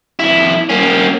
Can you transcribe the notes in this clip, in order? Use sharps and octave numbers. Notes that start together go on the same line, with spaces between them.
F2 E4
A#3 C#4